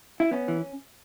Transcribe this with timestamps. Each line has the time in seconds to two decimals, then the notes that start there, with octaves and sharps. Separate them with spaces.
0.20 E4
0.31 B3 C#4
0.48 E3